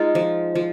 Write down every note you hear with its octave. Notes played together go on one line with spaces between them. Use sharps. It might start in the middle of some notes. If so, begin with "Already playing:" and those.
Already playing: G#3 D#4 F4 G#4
F3
F3